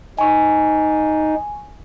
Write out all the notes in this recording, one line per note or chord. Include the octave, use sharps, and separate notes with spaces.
D#4 G#5 C#6